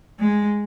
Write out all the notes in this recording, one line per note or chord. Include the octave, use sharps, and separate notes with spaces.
G#3